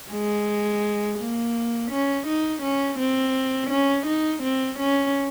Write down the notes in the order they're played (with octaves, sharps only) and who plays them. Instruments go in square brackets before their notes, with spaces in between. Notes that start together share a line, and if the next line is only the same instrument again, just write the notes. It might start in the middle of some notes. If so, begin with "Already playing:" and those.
[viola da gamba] G#3
A#3
C#4
D#4
C#4
C4
C#4
D#4
C4
C#4